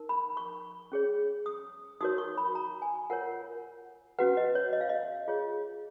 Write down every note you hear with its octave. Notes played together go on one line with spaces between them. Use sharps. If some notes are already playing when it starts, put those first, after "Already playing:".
Already playing: D#4 A#4
B5
C#6
C#4 G#4 C#5
D#6
D#4 F#4 A#4 C#5 D#6
C#6
B5
A#5
G#5
F4 A#4 C#5 F#5
C#4 F#4 B4 F#5
D#5
C#5
D#5
F5
D#5
F4 G#4 C#5